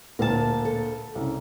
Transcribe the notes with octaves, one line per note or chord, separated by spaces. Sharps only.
D2 A#2 A#4 A5
A4
C2 C#3